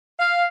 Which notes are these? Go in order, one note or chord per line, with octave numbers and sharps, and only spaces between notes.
F5